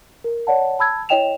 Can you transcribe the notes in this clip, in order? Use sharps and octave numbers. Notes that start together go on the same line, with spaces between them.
A#4
C#5 D5 F#5 A5
A5 B5 E6 G#6
E4 C#5 D#5 G5 E7 F7